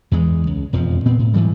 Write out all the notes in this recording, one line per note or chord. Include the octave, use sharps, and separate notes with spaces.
E2 E3 G#3
C#2
E1 F2 F3
A#2 B3 C4
A2
G#2 E3 F#3 G3